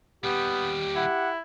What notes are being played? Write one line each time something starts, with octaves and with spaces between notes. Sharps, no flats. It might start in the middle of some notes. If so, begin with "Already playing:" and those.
D#2 G3 B3 G4
E4 F#5